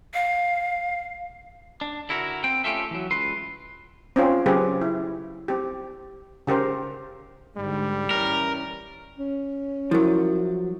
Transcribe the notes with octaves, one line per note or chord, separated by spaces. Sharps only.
F5
D4
D3 E4 F#4 A#4
C4 G5
A3 C#4 F4 G4 A4 E5
E3 F#3
C#2 B4 C6
C4 C#4 F4
C#3 F#3 C4 G4 G#4 B4
E4
C4 G4
C#3 G4 A#4 C5
G#2 D3 G3
E3 C#4 A#4
C#4
F3 F#3 E4 A#4 E5